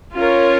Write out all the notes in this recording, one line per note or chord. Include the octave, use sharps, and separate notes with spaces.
C#4 F4 A#4 C#5